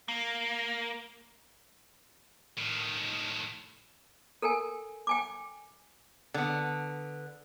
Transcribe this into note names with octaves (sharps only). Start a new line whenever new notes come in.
A#3
A2 D#3
A4 A#4 G5 G#5
G5 G#5 D6
D3 B3